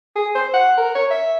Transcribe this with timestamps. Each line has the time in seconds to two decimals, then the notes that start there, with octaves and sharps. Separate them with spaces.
0.16 G#4
0.35 C5
0.53 F#5
0.78 A#4
0.95 C#5
1.10 E5